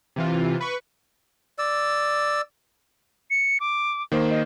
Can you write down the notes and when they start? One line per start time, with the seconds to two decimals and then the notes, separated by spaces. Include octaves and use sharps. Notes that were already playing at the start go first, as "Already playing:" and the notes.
0.16 C3 E3 F4
0.61 B4 C#6
1.59 D5 E6
3.30 C#7
3.60 D6
4.12 D#3 A#3 C5
4.30 D#5